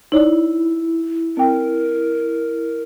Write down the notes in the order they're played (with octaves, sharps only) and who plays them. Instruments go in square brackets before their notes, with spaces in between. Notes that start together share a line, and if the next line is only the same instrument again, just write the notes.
[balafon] D#4 C#5 D5 [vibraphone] E4
[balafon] C4 G5 [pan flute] A#4